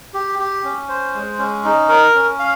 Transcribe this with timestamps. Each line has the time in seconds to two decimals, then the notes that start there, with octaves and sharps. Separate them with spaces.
0.14 G4
0.39 G4
0.64 C#4
0.89 C5
1.14 G#3
1.39 C#4
1.64 D#4
1.89 A#4
2.14 C#4
2.39 F5